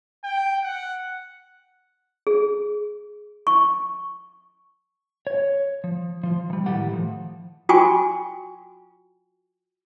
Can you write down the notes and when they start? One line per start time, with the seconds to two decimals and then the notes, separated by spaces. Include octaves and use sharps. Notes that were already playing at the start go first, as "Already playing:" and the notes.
0.24 G5
0.64 F#5
2.27 G#4
3.47 C#6
5.27 C#5
5.84 F3
6.23 F3 F4
6.50 E3 G3
6.66 A2 D#3 E3 A3 G4 F#5
6.89 A2 F3
7.69 F4 F#4 G5 G#5 C#6